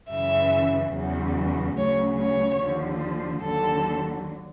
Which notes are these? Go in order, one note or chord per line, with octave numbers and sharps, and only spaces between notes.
F#2 C#3 E3 E5
E2 C#3 F#3
D2 C#3 F#3 C#5
C#5
D#2 D3 F3
D#2 D3 F#3 A4